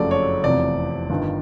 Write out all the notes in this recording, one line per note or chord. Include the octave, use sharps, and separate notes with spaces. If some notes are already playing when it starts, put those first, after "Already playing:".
Already playing: F#1 F2 C#3 F#3 A3 D5
C#5
F1 E2 C3 D5
G1 G2 D#3